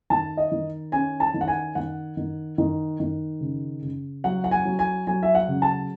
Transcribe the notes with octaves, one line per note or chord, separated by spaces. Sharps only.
D#3 A5
D#5
D#3
C#4 G#5
A5
D#3
F#5
G#5
D#3 F#5
D#3
D#3
D#3
C#3
C#3
F#3 F#5
F#5
G#5
F#3
G#5
F#3 G#5
E5
F#5
C#3
A5